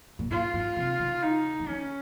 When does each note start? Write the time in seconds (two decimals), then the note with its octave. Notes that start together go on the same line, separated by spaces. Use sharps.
0.19 A#2
0.31 G#2 F4
0.54 G#2
0.77 C3
0.99 C#3
1.23 D#4
1.60 C#3
1.68 D#3 C#4